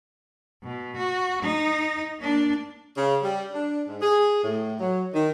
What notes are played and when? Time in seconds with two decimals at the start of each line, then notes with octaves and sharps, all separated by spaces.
0.63 B2
0.97 F#4
1.43 D#4
2.20 A#3 D4
2.96 C#3
3.22 G3
3.52 D4
3.88 G#2
4.01 G#4
4.42 A2
4.80 F#3
5.13 D#3